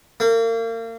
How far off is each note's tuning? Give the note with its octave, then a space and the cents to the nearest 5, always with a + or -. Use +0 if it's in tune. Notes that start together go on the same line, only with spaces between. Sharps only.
A#3 -35